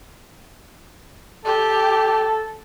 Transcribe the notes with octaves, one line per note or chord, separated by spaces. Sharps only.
G4 A4